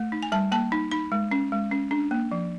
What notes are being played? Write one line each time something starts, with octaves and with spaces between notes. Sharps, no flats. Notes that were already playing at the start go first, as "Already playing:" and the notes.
Already playing: A3
D#4
G#5
G3 A5
A#3 A5
D#4
D#4 B5
G#3
C#4
G#3
C#4
D4
A#3
F3